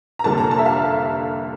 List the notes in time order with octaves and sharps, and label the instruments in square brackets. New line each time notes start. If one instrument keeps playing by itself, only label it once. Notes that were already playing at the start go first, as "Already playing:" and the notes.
[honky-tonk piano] A#5
F1 F2 D3 G3 A#3 A5
A#5
A5
E5
F5
E5